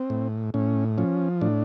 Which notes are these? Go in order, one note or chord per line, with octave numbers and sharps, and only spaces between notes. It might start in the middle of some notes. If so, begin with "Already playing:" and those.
Already playing: C4
A2
A2 C#4
F3 C#4
A2 D4